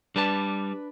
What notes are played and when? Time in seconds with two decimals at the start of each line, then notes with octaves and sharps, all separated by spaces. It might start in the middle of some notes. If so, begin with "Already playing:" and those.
0.16 G3 D4 B4 A5